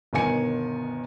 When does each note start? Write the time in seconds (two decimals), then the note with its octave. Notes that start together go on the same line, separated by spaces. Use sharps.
0.13 G1 B2 D#3 G#5 C#7